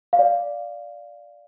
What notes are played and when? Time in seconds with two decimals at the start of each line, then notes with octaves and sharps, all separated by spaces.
0.13 F5
0.19 D5